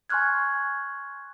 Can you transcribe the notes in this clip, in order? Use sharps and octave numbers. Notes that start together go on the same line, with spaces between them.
G#5 C6 C#6 F6 F#6 G#6